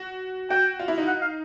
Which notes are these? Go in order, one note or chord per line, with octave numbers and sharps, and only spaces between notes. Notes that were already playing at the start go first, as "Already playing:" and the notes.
Already playing: F#4
F#4 G5
F4
E4
D#4
F#5
F5